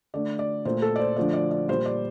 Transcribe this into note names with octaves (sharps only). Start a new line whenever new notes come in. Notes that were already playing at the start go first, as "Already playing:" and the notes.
D3 A3 D5
D5
A#2 A3 C5
A4
D5
C5
D3 F3 A3 D5
D5
D5
A#2 G3 C5
D5